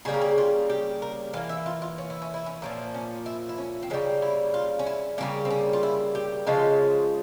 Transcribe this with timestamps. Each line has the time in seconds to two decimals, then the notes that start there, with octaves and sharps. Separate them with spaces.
0.05 C#3 G3 A#3 G#4
0.14 A#4
0.21 G#4
0.38 F4
0.69 G4
1.02 A#4
1.33 E3 F5
1.37 A#3
1.49 E5
1.66 F4
1.82 F4
1.98 C#4
2.10 E4
2.22 C#4
2.34 E4
2.46 C#4
2.62 A#2 F3 A#3 C#4
2.94 C#4
3.26 E4
3.49 E4
3.58 C#4
3.82 C4
3.90 C#3 E3 C#4
3.93 G3 A#3
4.22 E4
4.54 F4
4.79 C#4
4.86 E4
5.18 C#3 G3 A#3 C#4
5.45 C4
5.50 C#4
5.73 F4
5.83 E4
6.15 G4
6.47 C#3 F3 G#3 F4